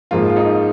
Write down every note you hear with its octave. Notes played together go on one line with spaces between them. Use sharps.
G#2 F3 A#3 F4
F4
D#4